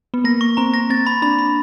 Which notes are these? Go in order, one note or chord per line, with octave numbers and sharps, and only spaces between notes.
B3
A#3 A#6
C#6
C4 A#5
A#6
C4 A6
B5
D4 B5
B5